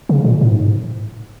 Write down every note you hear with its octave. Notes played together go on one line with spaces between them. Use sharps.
C#3
A#2
A2
G#2